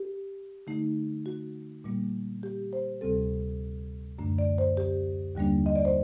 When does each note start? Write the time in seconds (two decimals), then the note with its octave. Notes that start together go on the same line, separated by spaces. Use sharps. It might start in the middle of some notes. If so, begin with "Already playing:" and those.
Already playing: G4
0.67 D3 A3 D#4
1.26 F#4
1.84 A#2 G3 A#3
2.43 G4
2.73 C5
3.01 D2 C3 G3 C4 A4
4.19 F#2 D3 A3 D4
4.38 D5
4.58 C5
4.77 G4
5.35 D#2 D3 G3 A#3 D4
5.66 D#5
5.76 D5
5.85 C5